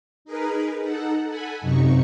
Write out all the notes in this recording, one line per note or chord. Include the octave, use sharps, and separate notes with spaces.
D#4 G#4 A#4 B4
D#4 A4 F#5
A4 F#5 G#5 B5
F#2 C3 D#4 C#6